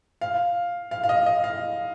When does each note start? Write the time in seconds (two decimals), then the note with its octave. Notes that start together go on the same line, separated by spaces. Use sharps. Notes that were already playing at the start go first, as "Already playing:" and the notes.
0.21 F5
0.91 F5
1.03 F5
1.09 D#5
1.26 D#5
1.44 F5